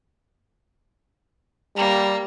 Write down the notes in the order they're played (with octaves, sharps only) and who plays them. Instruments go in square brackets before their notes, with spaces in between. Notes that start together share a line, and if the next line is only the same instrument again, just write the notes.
[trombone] G3 [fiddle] A#3